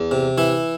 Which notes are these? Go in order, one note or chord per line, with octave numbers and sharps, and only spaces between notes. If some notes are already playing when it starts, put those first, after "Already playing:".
Already playing: E2
C3
E3 E4